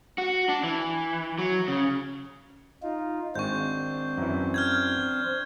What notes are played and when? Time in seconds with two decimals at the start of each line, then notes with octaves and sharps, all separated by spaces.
0.18 F#4
0.49 D4
0.63 E3
1.39 F#3
1.68 C#3
2.83 D#4 F4
3.35 G#1 G#3 C4 D4 C5 C#6 G6
4.18 F#2 E3
4.54 F6 G6 G#6